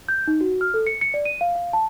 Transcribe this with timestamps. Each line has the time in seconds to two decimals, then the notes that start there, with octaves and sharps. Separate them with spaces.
0.08 G6
0.28 D#4
0.41 F#4
0.61 F6
0.74 A4
0.87 C#7
1.01 C#7
1.14 D5
1.25 D#7
1.41 F5
1.55 F5
1.73 A5